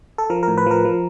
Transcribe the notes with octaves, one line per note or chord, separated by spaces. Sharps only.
A4
F3 A#4
A#4
A2
B4
F3 A#4
F3